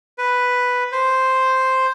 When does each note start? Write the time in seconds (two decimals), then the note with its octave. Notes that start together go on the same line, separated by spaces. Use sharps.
0.18 B4
0.92 C5